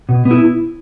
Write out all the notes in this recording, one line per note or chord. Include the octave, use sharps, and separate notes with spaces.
B2
B3
E4